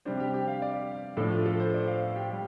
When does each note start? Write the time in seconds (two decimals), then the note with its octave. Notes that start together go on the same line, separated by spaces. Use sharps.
0.05 C3 G3 D4 C5
0.20 G4
0.34 G4
0.48 F5
0.62 D5
1.17 A2 F3 D4 A4
1.31 F4
1.46 A4
1.60 C5
1.74 D5
1.87 F5
2.16 G4
2.30 G3 G4